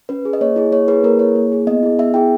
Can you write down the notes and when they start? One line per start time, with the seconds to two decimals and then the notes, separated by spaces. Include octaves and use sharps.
0.09 C#4 B4
0.25 G#4
0.33 D#5
0.41 A#3 C#5
0.56 E4 G#4
0.72 A#3 C#5
0.87 E4 G#4 B4
1.03 A#3 A#4
1.19 E4 G#4 C#5
1.35 A#3
1.52 E4 G#4
1.67 B3 D#5
1.83 E4 G#4
1.99 B3 E5
2.14 E4 G#4 G5